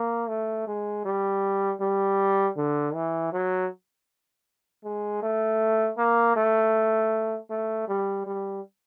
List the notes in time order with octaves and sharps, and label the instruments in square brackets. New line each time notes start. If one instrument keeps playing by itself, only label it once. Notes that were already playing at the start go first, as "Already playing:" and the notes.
Already playing: [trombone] A#3
A3
G#3
G3
G3
D3
E3
F#3
G#3
A3
A#3
A3
A3
G3
G3